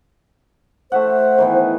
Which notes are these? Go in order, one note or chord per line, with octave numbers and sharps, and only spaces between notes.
A3 C5 E5 F#5
D#3 E3 B3